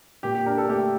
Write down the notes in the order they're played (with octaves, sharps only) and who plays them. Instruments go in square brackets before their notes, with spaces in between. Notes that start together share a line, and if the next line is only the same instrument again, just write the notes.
[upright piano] A#2 G4
G4
D4 A#4
A4
A3 G4